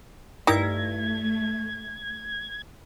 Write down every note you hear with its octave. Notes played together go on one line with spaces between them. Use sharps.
G2 A3 D#4 E4 G4 A#4 G#6 A#6